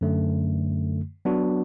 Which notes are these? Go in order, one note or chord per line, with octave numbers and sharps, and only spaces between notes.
F#2 D3 A3
F#3 B3 D4 F#4